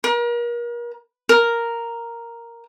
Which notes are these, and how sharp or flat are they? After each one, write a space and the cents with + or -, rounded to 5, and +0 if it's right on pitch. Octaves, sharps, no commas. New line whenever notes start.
A#4 +35
A#4 +0